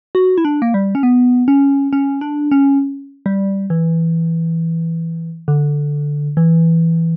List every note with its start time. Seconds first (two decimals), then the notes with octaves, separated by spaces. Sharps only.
0.15 F#4
0.38 E4
0.45 D4
0.62 A#3
0.74 G3
0.95 C#4
1.03 B3
1.48 C#4
1.93 C#4
2.21 D4
2.51 C#4
3.26 G3
3.70 E3
5.48 D3
6.37 E3